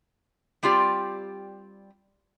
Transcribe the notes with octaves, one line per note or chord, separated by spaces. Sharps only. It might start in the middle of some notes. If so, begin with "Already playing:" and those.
G3 C4 F4 G4 D5